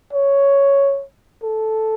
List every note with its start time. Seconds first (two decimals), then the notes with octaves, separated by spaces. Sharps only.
0.13 C#5
1.43 A4